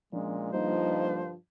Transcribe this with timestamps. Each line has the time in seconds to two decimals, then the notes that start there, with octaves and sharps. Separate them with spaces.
0.13 A#2 F3 G#3 C#4 D4
0.53 G2 D3 F3 G3 A#3 D4 D#4 C5